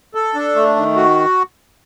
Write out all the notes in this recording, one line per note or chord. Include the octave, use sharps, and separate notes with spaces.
A4
D4
A3
D#3
F#4